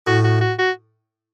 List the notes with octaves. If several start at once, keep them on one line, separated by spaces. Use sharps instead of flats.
A2 F#4
F#4
F#4
F#4